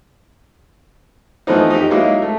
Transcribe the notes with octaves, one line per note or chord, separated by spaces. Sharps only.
E3 F3 A3 B3 C4 D#4
D#4 G4
F#3 G#3 A#3 D#4 E4
A3